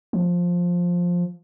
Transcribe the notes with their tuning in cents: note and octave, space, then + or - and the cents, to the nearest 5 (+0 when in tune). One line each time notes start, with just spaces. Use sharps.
F3 +10